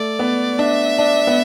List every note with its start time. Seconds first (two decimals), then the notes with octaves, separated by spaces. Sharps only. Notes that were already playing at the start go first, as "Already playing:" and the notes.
Already playing: A3 D5
0.19 B3
0.59 D4 E5
0.98 D4
1.27 B3